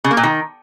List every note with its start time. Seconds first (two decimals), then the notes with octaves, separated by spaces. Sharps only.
0.04 C#3
0.11 A#3
0.17 A#2
0.23 D#3